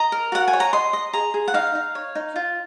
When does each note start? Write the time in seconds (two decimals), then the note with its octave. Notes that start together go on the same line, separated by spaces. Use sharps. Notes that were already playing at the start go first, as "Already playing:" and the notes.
Already playing: D#5 A#5
0.12 A#4
0.32 F#4 F#5
0.48 G#5
0.53 C#5
0.60 A#5
0.73 D#5 C6
0.93 D#5
1.13 G#4 A#5
1.34 G#4
1.48 F#5
1.54 D#4 F5
1.75 D#4
1.95 C#5
2.15 D#4
2.36 F4